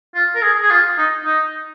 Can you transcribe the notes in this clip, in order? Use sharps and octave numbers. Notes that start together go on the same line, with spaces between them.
F4
A#4
G#4
G#4
F4
D#4
D#4